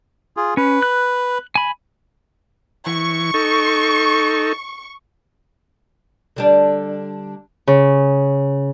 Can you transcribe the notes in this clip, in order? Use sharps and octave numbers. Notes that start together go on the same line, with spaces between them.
F4 G#4
C#4 B4
F#6
G#5 B5
E3 C#6
D#4 A4
D3 G3 D4
C#3